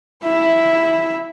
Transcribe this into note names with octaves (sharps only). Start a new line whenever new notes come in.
E4 E5